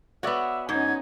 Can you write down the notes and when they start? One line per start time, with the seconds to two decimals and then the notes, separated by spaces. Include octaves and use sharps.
0.23 B3 F#4 C#5 D5 E5
0.69 G#2 C#4 D#4 G#6